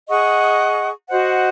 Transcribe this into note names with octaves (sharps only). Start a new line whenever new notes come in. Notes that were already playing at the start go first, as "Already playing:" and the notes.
G#4 D#5 F#5 C#6
F#4 C5 D#5 F#5